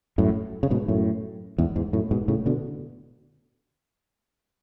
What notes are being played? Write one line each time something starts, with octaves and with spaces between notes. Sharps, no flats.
F#2 A2
C#3
G#2 B2
F#2 A2
E2 G#2
E2 G#2
F#2 A2
G#2 B2
A2 C#3
B2 D3